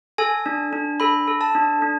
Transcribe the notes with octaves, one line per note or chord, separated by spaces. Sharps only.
A4 G#5
D4
D4
A4 B5
A4
A5
D4
D4